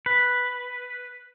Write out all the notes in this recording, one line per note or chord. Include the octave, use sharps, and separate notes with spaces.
B4